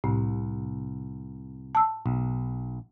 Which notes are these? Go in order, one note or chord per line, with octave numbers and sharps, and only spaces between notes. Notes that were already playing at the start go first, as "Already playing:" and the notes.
C2 A2
A5 E6
B1